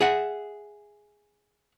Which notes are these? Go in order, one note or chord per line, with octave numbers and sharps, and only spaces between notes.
G#4 E5 F#5